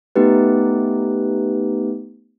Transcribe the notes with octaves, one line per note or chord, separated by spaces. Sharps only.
A3 B3 D#4 G4 B4